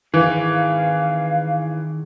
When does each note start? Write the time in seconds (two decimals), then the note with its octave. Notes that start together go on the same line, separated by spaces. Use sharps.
0.14 D#3 E3 G#4 F5